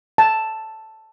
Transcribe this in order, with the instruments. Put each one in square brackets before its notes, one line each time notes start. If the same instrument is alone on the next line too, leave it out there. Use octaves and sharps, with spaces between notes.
[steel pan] A5